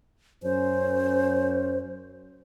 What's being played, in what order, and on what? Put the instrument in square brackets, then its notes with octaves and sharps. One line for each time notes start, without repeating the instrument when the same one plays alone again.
[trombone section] F#2 C#4 [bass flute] C5